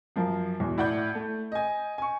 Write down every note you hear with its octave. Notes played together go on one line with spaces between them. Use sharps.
F#2 F3 A#4
E2 B2
A2 D5 F#5 B5 G6
A3
D#5 G#5
G#5 C#6